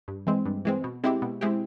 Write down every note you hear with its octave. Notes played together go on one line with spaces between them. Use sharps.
G2
E3 G#3 C4
G2
E3 G#3 C4
B2
G#3 C4 E4 G4
B2
G#3 C4 E4 G4